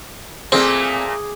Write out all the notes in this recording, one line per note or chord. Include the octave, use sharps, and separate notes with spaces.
A#2 A3 A#3 C4 G#4 G#5 D6